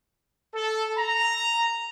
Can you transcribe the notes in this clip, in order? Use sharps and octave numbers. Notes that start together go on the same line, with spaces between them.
A4
A#5